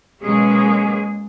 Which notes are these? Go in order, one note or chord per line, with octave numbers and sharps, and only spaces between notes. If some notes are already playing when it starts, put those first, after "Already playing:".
B2 F#3 G#3 A#3 C#4 G#4